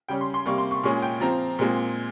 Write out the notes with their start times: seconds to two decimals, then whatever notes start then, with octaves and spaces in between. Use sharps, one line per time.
0.08 C#3 G3 C#4 G5
0.21 C6
0.34 C6
0.46 C3 G3 A#3 C#6
0.58 C6
0.71 C#6
0.84 A#2 G#3 C#4 C#6
1.02 G5
1.20 F3 C4 A#5
1.59 A#2 G#3 C4